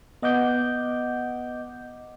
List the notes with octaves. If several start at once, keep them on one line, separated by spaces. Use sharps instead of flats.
B3 D#5 F#5 D6 G6